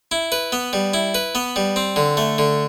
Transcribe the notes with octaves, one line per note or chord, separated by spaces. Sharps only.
E4
B4
B3
G3
E4
B4
B3
G3
C4
D3
A3
D3